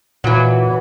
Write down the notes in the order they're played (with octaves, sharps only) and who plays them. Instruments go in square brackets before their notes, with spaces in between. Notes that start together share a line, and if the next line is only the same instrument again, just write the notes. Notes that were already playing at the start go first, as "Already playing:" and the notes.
[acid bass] A#2 [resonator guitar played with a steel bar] E3 F#3